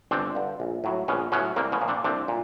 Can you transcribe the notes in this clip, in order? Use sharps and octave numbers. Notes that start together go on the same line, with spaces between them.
G1 C4 D4
G2 D3
A#1
A2 F#3
A#1 B3 C#4
A2 F#3 B3 C#4
C2 A#3 C4
B3 C#4
A#2 F3
C4 D4
C2 C4 D4
A#2